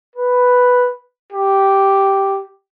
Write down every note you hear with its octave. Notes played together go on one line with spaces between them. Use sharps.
B4
G4